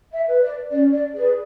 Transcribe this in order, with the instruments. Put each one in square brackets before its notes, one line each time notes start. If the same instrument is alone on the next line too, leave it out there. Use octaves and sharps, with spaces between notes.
[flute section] E5
B4
D5
C#4 D5
D5
G#4 D5
B4